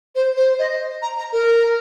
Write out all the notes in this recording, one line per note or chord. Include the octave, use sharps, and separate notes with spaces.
C5
C5
D#5
A#5
A#5
A#4